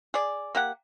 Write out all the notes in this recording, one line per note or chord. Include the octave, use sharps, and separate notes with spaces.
G#4 D5
A#3 G4 F#5